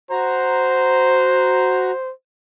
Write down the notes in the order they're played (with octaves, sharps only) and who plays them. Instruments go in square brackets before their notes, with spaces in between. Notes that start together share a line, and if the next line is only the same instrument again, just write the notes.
[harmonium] F#4 A#5 [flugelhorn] C5